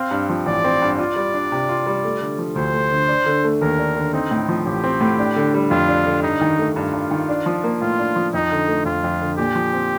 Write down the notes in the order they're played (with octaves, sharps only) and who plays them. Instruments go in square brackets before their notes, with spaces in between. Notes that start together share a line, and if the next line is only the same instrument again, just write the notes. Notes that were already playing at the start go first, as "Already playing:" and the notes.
Already playing: [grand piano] C4 [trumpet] F5
[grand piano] G2
F3
[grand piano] A1 [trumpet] D5
[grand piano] C4
G2
[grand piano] F4 [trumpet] D5
[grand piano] G3
D4
C3
F4
G3
A3
D3
F3
[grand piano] D2 [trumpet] C5
[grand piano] A3
D3
D4
D3
A3
[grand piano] D#2 [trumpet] A#4
[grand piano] D4
D3
[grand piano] C4 [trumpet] D#4
[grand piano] A2
F3
[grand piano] A1 [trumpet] G4
[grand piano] C4
A2
D4
D3
G3
[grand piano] F2 [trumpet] F4
[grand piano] D4
D3
[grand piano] G2 [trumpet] D#4
[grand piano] D#3
A3
[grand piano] G2 [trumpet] F4
[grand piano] G2
D#3
D4
F3
A#3
[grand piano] A2 [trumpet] F4
[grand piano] D4
F3
[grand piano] F2 [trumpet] D#4
[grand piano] D3
A3
[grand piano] F2 [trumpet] F4
[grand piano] F2
D3
[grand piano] A#2 [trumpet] G4
[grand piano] F3
C4